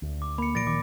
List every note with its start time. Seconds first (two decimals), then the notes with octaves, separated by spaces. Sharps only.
0.02 D2
0.22 D6
0.38 A#3 B5 C#7
0.55 A#2 F3 A6 A#6 D7
0.67 D#3 D6